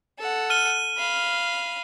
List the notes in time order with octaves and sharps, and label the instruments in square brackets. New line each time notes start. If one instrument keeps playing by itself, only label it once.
[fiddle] A4 F#5
[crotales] F6 D#7 G7
[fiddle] F5 B5